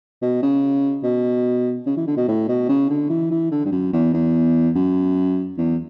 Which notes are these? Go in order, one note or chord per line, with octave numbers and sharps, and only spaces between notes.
B2
C#3
B2
C#3
E3
D3
B2
A2
B2
C#3
D3
E3
E3
D3
G2
F#2
E2
E2
F#2
E2